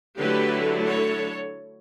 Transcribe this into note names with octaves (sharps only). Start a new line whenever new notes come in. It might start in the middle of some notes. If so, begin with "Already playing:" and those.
D3 F#3 A3 E4 G4 B4
A4 C#5